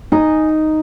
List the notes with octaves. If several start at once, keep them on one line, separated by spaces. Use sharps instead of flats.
D#4 G#5